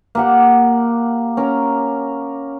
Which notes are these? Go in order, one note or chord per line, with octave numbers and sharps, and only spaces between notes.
A#3 G4 F#5
C#4 A#4